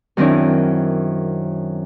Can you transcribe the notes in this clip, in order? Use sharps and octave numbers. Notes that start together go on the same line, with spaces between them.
F#2 D#3 C4 D4 E4